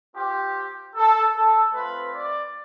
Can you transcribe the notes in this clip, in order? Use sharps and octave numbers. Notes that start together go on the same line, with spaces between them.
C4 F4 G4
A4
A4
A3 C4 F4 B4
D5